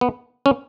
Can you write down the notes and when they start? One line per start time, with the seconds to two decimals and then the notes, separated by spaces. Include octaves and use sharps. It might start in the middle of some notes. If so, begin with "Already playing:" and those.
0.01 B3
0.46 C#4